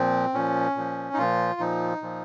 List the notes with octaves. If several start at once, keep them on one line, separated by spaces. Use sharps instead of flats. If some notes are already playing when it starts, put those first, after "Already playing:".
Already playing: A#2 F3 C4
A#2 F3 C#4
A#2 F3
D#4
A#2 F3 F4
A#2 F3 D#4
A#2 F3